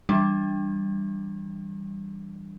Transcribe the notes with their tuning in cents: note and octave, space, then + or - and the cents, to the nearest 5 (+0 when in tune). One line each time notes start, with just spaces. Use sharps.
E3 +0 G3 +0 D4 +0